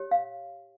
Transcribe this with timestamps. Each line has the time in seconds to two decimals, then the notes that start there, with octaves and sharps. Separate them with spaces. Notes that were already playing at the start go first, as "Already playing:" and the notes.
Already playing: G4 C#5
0.11 F5